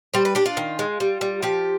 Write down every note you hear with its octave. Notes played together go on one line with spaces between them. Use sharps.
G3 C5
B4
D4 G4
F4
D#3
G#3
G3
G3
F3 G4